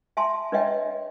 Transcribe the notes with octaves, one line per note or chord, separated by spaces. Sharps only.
E5 G#5 A5 C6
D4 B4 C#5 D#5 E5 G5